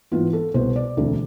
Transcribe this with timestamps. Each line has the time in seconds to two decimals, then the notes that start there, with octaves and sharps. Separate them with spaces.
0.12 G#2 E3 B3 F4
0.33 A4
0.54 C2 B2 B3 C5
0.76 D5
0.97 E1 D2 D3 A3 C4